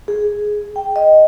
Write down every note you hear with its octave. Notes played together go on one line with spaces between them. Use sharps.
G#4
G5
D#5